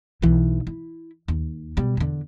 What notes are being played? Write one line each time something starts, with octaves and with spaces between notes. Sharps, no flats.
B1 E3
E4
D#2
B2 G3
E2 D3